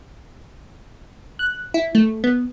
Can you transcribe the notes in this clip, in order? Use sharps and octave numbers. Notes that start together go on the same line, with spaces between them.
F#6
E4
A3
B3